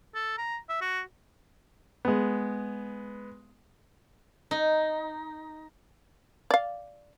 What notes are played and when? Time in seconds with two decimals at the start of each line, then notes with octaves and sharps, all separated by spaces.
0.14 A4
0.37 A#5
0.69 E5
0.81 F#4
2.05 G#3 B3
4.51 D#4
6.51 D5 F5